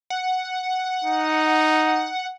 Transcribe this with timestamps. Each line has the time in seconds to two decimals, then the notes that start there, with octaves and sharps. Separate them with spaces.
0.10 F#5
1.05 D#4